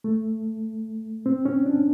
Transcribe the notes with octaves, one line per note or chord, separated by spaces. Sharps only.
A3
C4
C#4
D4